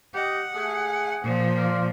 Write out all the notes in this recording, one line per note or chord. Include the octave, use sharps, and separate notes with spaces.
G4 D#5 F#5
A3 G#4
A#2 F3
F4 A#4 D5